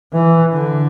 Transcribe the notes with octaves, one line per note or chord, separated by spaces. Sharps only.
E3
D3